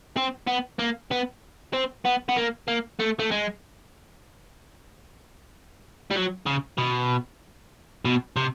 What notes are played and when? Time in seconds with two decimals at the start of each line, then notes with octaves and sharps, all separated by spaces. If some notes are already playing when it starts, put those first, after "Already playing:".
0.17 C4
0.47 B3
0.79 A#3
1.11 B3
1.73 C4
2.05 B3
2.29 B3
2.37 A#3
2.68 A#3
3.00 A3
3.20 A3
3.31 G#3
6.11 G3
6.16 F#3
6.47 C#3
6.78 B2
8.05 B2
8.36 C3